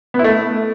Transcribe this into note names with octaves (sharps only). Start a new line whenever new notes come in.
B3
E4
A3